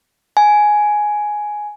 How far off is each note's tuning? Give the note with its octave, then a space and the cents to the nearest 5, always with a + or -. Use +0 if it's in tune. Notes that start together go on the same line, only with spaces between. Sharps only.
G#5 +10